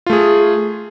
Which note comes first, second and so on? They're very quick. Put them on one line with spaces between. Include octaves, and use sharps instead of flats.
F4 A3 G#4